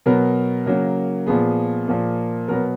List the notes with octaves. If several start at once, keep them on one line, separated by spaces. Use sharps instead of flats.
B2 F#3 B3 A#4
C#3 F#3 A#3
A#2 F3 B3 G#4
A#2 F3 A#3
B2 F#3 B3 A#4